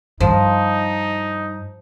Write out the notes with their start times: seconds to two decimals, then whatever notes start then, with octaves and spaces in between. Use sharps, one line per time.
0.20 G2 F3 D#4